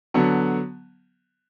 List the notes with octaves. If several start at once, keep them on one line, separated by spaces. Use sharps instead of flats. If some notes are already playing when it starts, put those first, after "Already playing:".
D3 F#3 B3